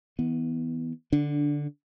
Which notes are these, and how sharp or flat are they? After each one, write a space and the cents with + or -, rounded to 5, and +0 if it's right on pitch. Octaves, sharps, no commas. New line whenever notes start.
E3 -35 B3 +0
D3 +0 D4 -15